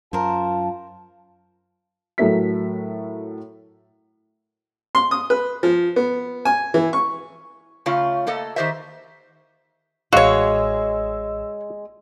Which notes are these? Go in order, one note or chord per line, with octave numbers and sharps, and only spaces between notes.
F#2 F4 A#4 C5 A5
A2 F#3 A4 A#4 E5 B6
C6
D#6
B4
F3
B3
G#5
E3
C#6
C#3 A3 C#4 F4
A3 A#3 A4 D#5
D#3 G4 C5 D#5 E5
A1 G#3 F#4 C#5 D#5 F5 E6